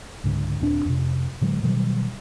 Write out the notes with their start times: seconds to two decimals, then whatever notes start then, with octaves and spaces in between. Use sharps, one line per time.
0.24 C#2 G#2 D3
0.60 D#1 C4 D4
0.85 F2 C3
1.41 A2 D3 F#3 G#3
1.63 B2 D#3 F#3 G3